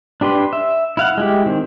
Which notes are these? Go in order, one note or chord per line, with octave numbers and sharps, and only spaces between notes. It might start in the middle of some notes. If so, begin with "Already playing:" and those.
D4 G4 B4 C6
E5
E4 F5 F#5
G#3 E4 G4
D#3 C4